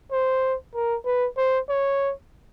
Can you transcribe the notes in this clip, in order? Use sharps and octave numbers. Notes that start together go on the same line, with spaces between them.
C5
A#4
B4
C5
C#5